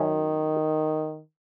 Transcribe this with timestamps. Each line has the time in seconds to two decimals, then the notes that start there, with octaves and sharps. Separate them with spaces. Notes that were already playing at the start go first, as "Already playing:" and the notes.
Already playing: F#2 D#3 C#4